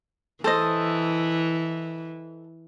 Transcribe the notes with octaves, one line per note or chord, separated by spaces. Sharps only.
E3 A4 C5 D#5